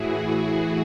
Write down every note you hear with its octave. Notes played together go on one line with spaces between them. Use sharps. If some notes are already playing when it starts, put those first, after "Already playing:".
Already playing: A2 E3 E4 F#4 G#4
E4